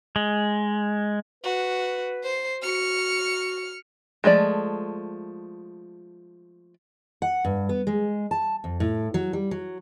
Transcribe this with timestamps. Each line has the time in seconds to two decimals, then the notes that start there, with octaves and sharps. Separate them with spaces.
0.16 G#3
1.44 F#4 B4
2.24 C5 C7
2.62 F#4 F6 C#7
4.24 F3 G#3 A3 D5
7.22 F#5
7.45 G2
7.69 B3
7.87 G#3
8.31 A5
8.64 F2
8.80 A2
9.14 F#3
9.33 G3
9.51 F#3